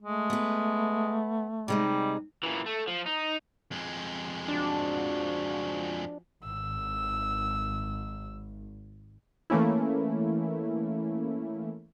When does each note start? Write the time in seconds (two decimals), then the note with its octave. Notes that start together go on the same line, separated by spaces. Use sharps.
0.02 G#3 A3
0.30 B3 B4
1.68 C3 G3 G#3 D#4
2.43 A#2 E3
2.66 A3
2.88 F3
3.06 D#4
3.71 F2 G#3
4.48 F3 D4 F#4
6.45 G#1 E6
9.50 E3 A3 A#3 C#4 E4